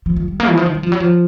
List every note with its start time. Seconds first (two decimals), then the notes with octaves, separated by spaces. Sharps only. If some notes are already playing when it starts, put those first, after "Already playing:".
0.06 F3
0.16 F3
0.28 G3
0.40 A#3
0.49 E3
0.57 F3
0.66 D#3
0.74 F#3
0.83 F3
0.92 F#3
1.00 F3